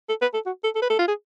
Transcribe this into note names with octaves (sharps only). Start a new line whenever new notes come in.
A4
B4
A4
F#4
A4
A4
B4
A4
F4
G#4